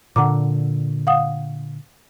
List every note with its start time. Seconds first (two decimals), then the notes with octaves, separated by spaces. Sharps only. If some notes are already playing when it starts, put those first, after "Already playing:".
0.16 A#2 D3 F#5 A#5 D6
1.07 F5 F#5 D#6